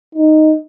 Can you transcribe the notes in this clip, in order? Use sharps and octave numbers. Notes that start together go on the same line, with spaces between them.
D#4